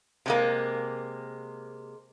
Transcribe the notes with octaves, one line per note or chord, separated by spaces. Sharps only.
C3 G#3 A#3